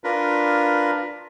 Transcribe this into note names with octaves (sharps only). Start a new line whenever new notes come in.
D4 F4 A#4 B4